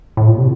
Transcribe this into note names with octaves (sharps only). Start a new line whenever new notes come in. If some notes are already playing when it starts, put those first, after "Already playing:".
A2
A#2
C3